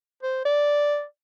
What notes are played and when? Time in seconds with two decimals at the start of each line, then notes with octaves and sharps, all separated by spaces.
0.23 C5
0.45 D5